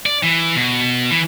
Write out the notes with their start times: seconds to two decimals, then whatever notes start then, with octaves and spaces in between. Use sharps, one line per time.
0.06 D5
0.23 E3
0.56 B2
1.11 E3